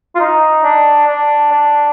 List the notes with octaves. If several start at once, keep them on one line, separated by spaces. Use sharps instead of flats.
F4
D#4
D4
D4
D4